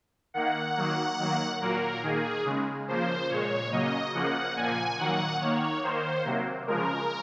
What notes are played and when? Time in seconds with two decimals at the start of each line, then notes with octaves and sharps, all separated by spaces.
0.34 D#3 A#3 F#5
0.76 D#3 F#3 A#3
1.19 D#3 F#3 A#3
1.61 A#2 F#3 A#3 A#4
2.03 D#3 A#3 G#4
2.45 C#3 G#3
2.88 C#3 F3 A#3 C5
3.30 A#2 G#3 C#5
3.72 C#3 F#3 A#3 D#5
4.14 C#3 F3 A#3 F#5
4.57 A#2 F3 A#3 G#5
4.98 D#3 F#3 A#3 F#5
5.41 D#3 A#3 C#5
5.83 D#3 A#3 C5
6.25 C3 F#3 A#3
6.67 C#3 F3 G#3 A#4